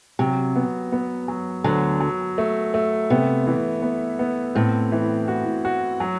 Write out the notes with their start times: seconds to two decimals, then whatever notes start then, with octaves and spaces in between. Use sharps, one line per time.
0.19 C3 F#3
0.56 B3
0.92 B3
1.28 F#3
1.64 D2 D3 F#3
2.01 F#3
2.38 A3
2.74 A3
3.10 C3 B3
3.47 E3
3.82 B3
4.19 B3
4.55 A2 C4
4.92 E3
5.28 F#4
5.65 F#4
6.00 F#3